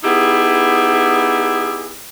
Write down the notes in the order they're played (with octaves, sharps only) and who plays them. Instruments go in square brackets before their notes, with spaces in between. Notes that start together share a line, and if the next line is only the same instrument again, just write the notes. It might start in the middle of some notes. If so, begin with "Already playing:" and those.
[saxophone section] B3 D#4 E4 G4 G#4